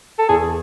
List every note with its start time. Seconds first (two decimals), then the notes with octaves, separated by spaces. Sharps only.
0.19 A4
0.29 E2 G#4